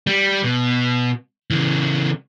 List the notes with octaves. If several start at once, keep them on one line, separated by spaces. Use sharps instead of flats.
G3
B2
C#3 E3